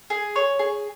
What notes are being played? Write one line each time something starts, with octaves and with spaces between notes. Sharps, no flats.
G#4
C#5
G#4